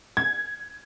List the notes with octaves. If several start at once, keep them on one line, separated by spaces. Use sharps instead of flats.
G#6